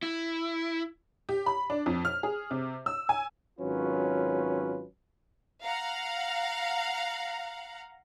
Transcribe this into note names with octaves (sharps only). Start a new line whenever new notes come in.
E4
G4
B5
D4
F2
F6
G#4
C3
E6
G#5
G#1 F#3 C#4 F4 B4
F5 F#5 A#5